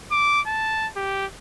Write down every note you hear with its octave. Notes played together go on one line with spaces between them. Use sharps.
D6
A5
G4